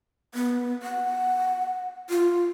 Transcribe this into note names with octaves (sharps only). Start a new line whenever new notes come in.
B3
F#5
F4